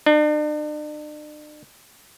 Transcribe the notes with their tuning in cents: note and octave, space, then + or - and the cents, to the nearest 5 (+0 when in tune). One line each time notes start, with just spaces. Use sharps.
D4 +45